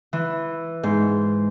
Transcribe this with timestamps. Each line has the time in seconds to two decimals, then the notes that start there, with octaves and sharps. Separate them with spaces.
0.13 E3
0.83 G#2